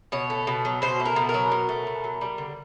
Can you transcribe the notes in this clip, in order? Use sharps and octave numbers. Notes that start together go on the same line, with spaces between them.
B2 C#5
A3
B2
F#3
B2 C5
A3
A#4
B2
A#4
F#3
B2
A3
B2
F#3
G3
D3